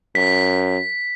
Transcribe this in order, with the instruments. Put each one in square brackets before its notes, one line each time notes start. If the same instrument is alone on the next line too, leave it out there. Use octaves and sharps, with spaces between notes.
[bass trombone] F#2 [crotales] B6